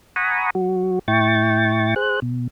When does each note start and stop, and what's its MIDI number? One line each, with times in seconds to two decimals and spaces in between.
0.16 0.50 78
0.16 0.50 80
0.16 0.50 82
0.16 0.50 83
0.16 0.50 85
0.16 0.50 87
0.55 0.99 54
0.55 0.99 66
1.08 1.94 45
1.08 1.94 64
1.08 1.94 79
1.08 1.94 85
1.08 1.94 93
1.96 2.20 68
1.96 2.20 72
1.96 2.20 90
2.22 2.48 47